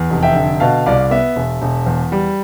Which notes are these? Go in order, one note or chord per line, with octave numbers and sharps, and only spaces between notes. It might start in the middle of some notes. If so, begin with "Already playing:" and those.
Already playing: E2
F1
E5 G5
D3
B2 F5 A5
C2 D5 F5
B3 E5
E1
E1
E2
G3